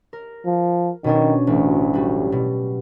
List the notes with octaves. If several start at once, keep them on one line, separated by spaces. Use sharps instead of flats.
A#4
F3
B2 D#3 C#4 D4
A1 D2
F#3 G3
B2